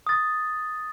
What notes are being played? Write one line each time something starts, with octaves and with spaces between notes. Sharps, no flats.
D#6 A6